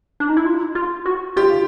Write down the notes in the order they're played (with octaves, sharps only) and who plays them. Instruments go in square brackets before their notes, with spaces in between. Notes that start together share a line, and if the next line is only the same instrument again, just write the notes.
[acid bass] D4
D#4
E4
F4
F4
F#4
[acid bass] F4 [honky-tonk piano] G4